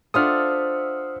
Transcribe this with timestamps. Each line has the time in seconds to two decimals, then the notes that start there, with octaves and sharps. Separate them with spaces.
0.14 D4 F4 A4 C5 E5 F#5 D#6 F6